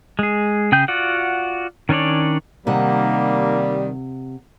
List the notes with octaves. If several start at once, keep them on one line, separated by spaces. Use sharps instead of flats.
G#3 G#4
C#3 G#4 G5 G6
F4 F#4 D5 F#5
D#3 C#4 D4 C#5 D5
C3 D#3 G3 A#3 F#5